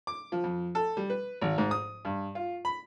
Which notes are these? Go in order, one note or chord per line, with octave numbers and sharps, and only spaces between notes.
D6
F3
F2
A4
G3
B4
G#1
G#2
D#6
G2
F4
B5